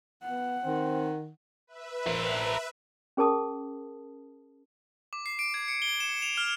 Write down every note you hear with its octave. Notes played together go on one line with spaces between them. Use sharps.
B3 F#5
D#3 C4
B4 E5
A#4 C5
C#4 G#4 A#4 A5 D#6
D6
C7
D7
G#6
C#7
G7
E7
F7
F6